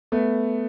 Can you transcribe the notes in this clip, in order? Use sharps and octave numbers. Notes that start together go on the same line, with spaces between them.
A3 B3